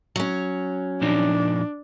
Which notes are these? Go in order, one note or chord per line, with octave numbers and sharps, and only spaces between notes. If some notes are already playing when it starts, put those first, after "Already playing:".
F#3 C#4
A#2 F3 D4 D#4